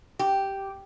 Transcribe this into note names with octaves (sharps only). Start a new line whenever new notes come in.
G4